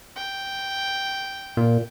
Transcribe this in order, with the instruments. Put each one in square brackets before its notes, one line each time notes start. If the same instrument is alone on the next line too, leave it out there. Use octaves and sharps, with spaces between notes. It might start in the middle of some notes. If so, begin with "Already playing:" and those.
[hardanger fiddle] G5
[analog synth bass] A#2